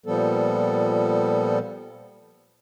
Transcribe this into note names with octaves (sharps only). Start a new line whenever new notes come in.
A#2 F3 G3 B3 A4